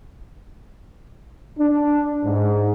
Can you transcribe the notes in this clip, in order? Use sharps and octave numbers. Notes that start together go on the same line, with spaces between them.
D4
G#2